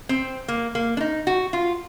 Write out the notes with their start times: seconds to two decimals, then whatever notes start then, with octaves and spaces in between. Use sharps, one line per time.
0.09 C4
0.48 A#3
0.75 A#3
0.97 D4
1.01 D#4
1.27 F#4
1.53 F4